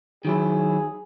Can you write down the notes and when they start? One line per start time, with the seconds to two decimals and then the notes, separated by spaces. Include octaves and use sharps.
0.25 D#3 F#3 E4 G#4